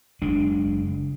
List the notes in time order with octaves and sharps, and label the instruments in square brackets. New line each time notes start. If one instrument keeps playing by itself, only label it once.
[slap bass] F#1 G#3 D4